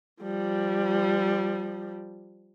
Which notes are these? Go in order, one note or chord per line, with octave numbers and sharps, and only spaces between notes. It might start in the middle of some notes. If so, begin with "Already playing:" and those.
F3 G3